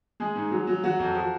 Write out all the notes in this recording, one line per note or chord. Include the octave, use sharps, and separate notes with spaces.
G#3 G#4
G#2
F#3
F#3
F#3 F#4
F2
F3